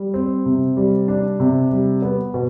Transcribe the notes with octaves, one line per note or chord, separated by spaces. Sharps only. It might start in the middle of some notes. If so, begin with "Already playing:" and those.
Already playing: G3
C4
C3
G3
D4
C3
G3
B3
B2